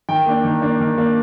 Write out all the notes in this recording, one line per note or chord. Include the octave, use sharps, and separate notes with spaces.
D#3 G5
A#3 D4
D#3
A#3 D4
D#3
A#3 D4